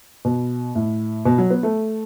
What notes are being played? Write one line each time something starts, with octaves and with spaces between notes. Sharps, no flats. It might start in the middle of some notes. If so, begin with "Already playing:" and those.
B2
A2
B2
F#3
B3
A3